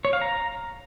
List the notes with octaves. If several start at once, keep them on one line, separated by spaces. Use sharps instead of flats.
C#5
F5
A#5